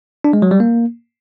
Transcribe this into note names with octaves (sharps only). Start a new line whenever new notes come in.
D4
G#3
F#3
G3
A#3